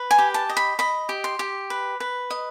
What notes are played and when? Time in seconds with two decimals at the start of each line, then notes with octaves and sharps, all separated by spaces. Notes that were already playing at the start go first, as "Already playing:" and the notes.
Already playing: B4
0.11 G#5
0.18 G4
0.34 A5
0.49 D#5
0.57 B5
0.79 D#5 B5
1.09 G4
1.24 C6
1.39 G4
1.70 B4
2.00 B4
2.30 D#5